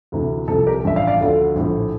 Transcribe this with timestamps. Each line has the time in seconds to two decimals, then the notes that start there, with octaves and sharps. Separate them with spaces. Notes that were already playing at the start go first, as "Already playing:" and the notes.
0.12 D2 C3 E3
0.48 C2 C3 F3 A4
0.67 G4 A#4
0.84 A1 G2 F3 E5
0.96 D5 F5
1.07 D5 F5
1.20 D2 D3 F3
1.56 A#1 A2 F3